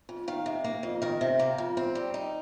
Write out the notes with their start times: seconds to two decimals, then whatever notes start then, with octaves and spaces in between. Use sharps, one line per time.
0.09 F2
0.28 D#3 F5
0.46 C3
0.64 A#3
0.83 F2
1.02 D#3 A#4
1.21 C3
1.39 A#3
1.58 F2
1.77 C4
1.95 G3
2.14 D#4